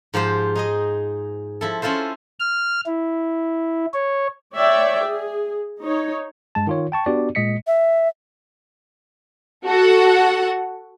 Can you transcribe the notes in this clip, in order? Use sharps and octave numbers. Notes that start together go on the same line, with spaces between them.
G#2 F3 G4 C5
D#4 G#4 D#5
F3 E4 A4
C#4 E4 F4 A4 C5
F6
E4
C#5
C#5 D5 E5 G5
G#4
D#4 C#5
G2 G#3 A5
D#3 F4 C#5
G5 A5 C#6
B3 D4 F#4 G4 D5
A#2 G#3 D#5 B6 C#7
E5
F#4 A4 F#5